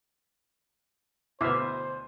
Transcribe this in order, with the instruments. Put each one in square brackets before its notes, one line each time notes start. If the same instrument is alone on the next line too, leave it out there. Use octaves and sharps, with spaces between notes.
[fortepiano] D2 B2 B4 [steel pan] E4 E5 F5 [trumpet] C5 [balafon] D6